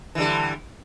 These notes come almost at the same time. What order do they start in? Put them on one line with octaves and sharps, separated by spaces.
E3 D3 G3